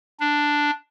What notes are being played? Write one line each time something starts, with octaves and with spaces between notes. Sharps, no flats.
D4